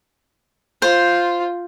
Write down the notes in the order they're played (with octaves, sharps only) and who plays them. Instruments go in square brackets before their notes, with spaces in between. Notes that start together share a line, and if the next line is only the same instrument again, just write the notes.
[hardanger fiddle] F4 [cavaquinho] C5